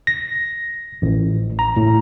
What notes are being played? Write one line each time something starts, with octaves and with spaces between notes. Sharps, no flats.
A#6
A1
A#5
A2